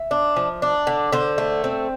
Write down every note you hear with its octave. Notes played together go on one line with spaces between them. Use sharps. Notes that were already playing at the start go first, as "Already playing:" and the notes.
Already playing: E5
D4
F3
D4
D3
D3 C5
A3
C4